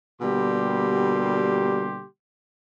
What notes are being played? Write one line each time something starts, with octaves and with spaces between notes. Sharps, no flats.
B2 D3 G3 A#3 G4 C6